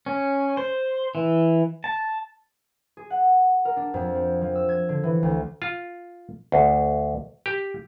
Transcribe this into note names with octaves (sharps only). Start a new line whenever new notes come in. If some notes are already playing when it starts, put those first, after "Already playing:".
C#4
C5
E3
A5
G#4
F#5
A#4
D4
F2
C4
F3
E6
G#6
D3
E3
D2
F4
D2
G4